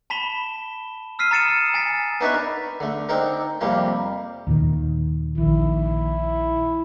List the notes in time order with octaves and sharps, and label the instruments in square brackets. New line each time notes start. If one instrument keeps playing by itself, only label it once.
[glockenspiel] A5 B5 B6 E7 G7
E6 F6 B6 C7 D#7
A#5 D#6 A6 C#7 D#7 E7
G#5 A6 B6
[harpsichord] B3 D4 D#4 B4 C#5 E5
A#4
D3 A3
C4 D4 D#4 A4 A#4
F2 C3 G3 A#3 F4
[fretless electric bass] D#2 A#2 D#3
[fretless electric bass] A#1 D#3 [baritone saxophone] E4